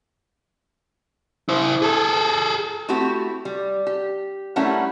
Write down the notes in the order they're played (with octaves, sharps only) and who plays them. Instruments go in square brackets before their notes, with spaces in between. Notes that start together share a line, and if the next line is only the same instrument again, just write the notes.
[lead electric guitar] E4 C5
G#4 A4
[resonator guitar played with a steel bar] A3 C4 E4 F#4 G4
G3
G4
G3 A3 C#4 E4 A#4 F#5